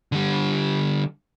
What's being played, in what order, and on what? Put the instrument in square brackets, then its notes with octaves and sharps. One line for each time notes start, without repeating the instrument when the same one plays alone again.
[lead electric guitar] D3 G3